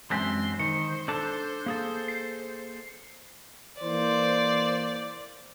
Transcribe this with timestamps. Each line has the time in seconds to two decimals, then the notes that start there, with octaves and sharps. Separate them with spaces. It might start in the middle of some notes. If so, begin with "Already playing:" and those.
0.11 F#2 E3 G#3 C4 D4 C6
0.60 D#3 C5 C#7
1.08 D4 A4 A5
1.66 A#3 G#4 A4
2.08 C7
3.82 E3 A#3 C5 D5